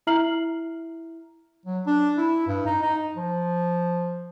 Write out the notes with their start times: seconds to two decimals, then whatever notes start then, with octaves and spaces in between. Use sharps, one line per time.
0.07 E4 E5 A#5 F6 C7 F#7
1.66 F#3
1.86 D4
2.17 E4
2.47 G2
2.66 D#4
2.83 D#4
3.17 F3